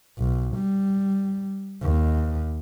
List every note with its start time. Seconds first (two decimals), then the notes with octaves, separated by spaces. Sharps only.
0.19 B1
0.56 G3
1.82 D#2